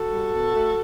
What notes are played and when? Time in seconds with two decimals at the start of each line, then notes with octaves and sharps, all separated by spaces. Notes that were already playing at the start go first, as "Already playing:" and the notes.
Already playing: F#4 A4
0.12 G3
0.33 B2
0.55 A3